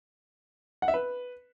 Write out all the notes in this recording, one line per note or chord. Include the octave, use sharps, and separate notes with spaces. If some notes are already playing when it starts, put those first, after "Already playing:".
F#5
E5
B4